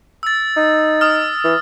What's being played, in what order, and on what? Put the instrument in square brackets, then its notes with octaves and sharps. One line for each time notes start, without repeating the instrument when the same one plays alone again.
[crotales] E6 A6
[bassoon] D#4
[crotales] D#6 F6
[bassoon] E3